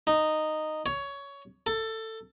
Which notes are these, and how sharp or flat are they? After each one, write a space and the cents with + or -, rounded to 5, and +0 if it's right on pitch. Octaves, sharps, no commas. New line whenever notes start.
D#4 -10
C#5 +15
A4 +15